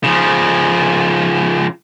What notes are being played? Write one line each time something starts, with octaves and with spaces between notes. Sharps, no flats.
C#3 F3